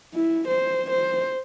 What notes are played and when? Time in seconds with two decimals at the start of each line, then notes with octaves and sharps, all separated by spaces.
0.14 E4
0.47 C5
0.90 C5